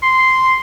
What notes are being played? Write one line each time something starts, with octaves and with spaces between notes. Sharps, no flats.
C6